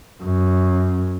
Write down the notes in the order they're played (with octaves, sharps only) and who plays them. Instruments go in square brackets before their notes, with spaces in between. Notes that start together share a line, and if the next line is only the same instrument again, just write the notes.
[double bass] F#2